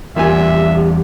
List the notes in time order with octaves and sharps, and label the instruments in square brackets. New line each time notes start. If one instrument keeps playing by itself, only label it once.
[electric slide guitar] E2 G3 [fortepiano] A#2 G#5 [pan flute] G4 [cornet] E5